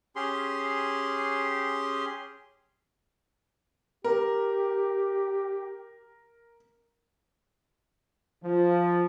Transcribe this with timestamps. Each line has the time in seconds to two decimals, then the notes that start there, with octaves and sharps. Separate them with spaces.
0.16 C#4 G4 G#4 C6
4.04 G4 A#4
8.44 F3